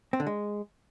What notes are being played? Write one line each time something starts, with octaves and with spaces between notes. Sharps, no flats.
C4
D3
G#3